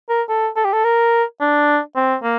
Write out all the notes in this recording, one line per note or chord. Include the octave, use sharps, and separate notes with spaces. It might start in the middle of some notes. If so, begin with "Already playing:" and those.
A#4
A4
A4
G4
A4
A#4
D4
C4
A#3